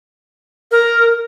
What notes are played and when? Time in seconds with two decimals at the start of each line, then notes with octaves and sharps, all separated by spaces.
0.72 A#4